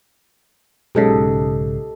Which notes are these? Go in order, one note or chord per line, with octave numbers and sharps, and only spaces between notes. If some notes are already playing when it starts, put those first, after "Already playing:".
B1 G#2 C#3 G4 A4 D#5